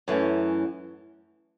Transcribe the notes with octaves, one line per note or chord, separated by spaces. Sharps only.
F#2 E3 A3 C#4